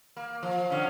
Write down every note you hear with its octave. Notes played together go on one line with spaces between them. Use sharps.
A#3
F3
D3 C#4